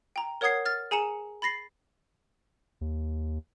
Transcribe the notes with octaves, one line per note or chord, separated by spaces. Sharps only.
G5 A#5
A#4 C#5 F#5 D#6 G#6 C7
F6 A6
G#4 G#5 A#5 C#7 E7
B5 A6 A#6 C7
D#2